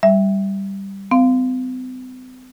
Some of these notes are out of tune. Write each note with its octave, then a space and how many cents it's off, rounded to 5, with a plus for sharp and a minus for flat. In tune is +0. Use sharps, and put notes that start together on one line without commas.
G3 +0 E5 +0
C4 -45 F5 +0